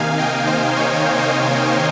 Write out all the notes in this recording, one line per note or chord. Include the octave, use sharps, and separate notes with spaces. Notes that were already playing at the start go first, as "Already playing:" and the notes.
Already playing: C3 D#3 A#3 D#4 F5 G#5
D#5 G5
C5
C#5
C5 D#5